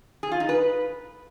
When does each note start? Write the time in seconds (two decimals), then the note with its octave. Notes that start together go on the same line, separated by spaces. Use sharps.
0.23 G#4
0.32 F4
0.40 D#4
0.49 B4